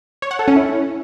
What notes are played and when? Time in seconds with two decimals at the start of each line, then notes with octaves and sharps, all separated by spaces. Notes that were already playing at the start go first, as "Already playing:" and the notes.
0.22 C#5
0.31 F#5
0.39 A4
0.48 C#4
0.56 E4